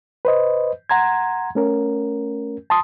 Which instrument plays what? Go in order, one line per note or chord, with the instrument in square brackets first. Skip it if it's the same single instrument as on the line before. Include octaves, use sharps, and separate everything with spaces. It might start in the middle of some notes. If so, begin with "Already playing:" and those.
[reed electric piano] B4 C5 D#5
F#5 A#5 C6 G#6
A3 C#4 A#4
A5 C6 D#6